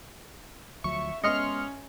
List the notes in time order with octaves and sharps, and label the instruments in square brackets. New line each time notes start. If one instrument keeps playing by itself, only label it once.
[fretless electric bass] D2 F3 F#3 [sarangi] E5 [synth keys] C#6
[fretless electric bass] G#3 B3 [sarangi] C#4 [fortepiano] D#5 [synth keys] C6 F6 C#7